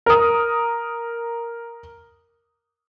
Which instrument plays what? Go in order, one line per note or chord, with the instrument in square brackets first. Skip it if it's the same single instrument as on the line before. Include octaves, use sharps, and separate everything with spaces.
[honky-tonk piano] A#4 D#6